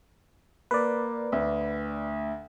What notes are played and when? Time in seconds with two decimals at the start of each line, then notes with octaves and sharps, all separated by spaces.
0.71 A#3 B4 D5
1.32 D2